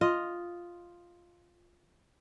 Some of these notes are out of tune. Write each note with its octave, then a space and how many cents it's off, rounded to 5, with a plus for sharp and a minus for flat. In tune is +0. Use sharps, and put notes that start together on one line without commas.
F4 +0 D#5 +0